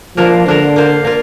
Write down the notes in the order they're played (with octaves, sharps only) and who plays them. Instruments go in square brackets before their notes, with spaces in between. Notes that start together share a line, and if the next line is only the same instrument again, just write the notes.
[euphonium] F3 [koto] A#3 D4 F4 A#4
[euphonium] D3 [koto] A#3 D4 F4 A#4
[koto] A#3 F4 C5
A#3 F4